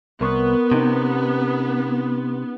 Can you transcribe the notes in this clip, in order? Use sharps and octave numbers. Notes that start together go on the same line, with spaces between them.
C2 B3 A#4 C6 C#6
C3 C#4 D#4 G4